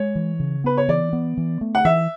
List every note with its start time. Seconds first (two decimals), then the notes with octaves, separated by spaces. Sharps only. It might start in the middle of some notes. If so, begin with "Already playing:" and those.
Already playing: G#3 C#5
0.15 E3
0.40 C#3
0.64 B3 B4
0.77 C#5
0.88 E3 D5
1.13 B3
1.37 E3
1.61 A3
1.75 F#5
1.85 E3 E5